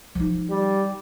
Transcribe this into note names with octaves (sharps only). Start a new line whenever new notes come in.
F3 D#4
G3